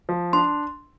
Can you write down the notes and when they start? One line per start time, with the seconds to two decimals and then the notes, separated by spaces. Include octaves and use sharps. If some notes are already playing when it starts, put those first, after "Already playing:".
0.09 F3
0.33 D4 C6